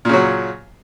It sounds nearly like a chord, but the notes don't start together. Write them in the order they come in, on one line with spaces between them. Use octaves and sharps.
A#2 C#3 F#3